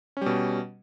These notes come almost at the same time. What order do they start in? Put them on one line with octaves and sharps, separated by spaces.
C#4 G3 B2